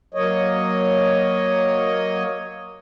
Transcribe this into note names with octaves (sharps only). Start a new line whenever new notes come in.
F#3 A#3 C#5 D#5